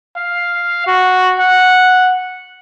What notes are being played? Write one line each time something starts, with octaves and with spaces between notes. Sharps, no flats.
F5
F#4
F#5